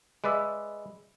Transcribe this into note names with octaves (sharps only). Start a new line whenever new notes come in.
G#3 B4 D5 E5